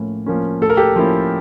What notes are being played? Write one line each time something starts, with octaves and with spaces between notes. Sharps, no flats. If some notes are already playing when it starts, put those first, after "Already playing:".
Already playing: A2 F3 A#3 C#4
F3 A#3 C#4
A2 A4
A#4
G4 A4
F3 A#3 C#4 E4